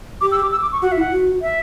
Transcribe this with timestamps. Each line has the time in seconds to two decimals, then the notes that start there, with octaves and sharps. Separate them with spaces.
0.21 G4 D6
0.32 E6
0.42 D6
0.52 E6
0.62 D6
0.72 C#6
0.82 F#4 F#5
0.92 E4 E5
1.01 F#5
1.12 F#4
1.42 E5